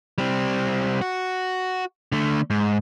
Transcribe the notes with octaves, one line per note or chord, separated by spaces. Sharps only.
G3 C4
F#4
D3 A3
G#2